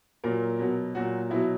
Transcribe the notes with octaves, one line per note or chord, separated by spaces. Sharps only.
A#2 F#3 A#4
B2 F#3
A#2 F#3 F#4
B2 F#3 E4